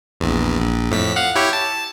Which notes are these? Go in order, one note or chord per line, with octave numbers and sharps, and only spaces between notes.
A#1 E2
A#1
F2 A2 B6
F5 F#5
E4 G4 C#5
A5